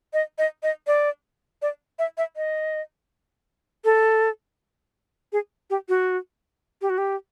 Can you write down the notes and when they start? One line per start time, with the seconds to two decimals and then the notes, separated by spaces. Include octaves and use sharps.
0.13 D#5
0.38 D#5
0.63 D#5
0.87 D5
1.62 D5
1.99 E5
2.18 E5
2.37 D#5
3.85 A4
5.33 G#4
5.70 G4
5.89 F#4
6.82 G4
6.90 F#4
6.98 G4